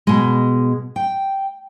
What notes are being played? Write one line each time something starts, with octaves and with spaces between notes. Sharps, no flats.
B2 G#3
G5